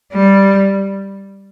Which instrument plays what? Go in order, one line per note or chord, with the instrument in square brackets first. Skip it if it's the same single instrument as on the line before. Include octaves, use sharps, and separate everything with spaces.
[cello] G3